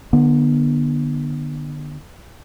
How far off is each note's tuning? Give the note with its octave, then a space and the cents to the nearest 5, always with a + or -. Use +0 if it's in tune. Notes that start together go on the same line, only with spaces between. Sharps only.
D3 +30 B3 -25